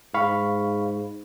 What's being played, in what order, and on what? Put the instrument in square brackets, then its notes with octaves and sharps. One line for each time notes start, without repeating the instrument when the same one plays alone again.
[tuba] G#2 [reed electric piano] F5 B5 C#6